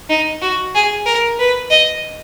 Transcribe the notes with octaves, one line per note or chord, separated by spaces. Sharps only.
D#4
F#4
G#4
A#4
B4
D#5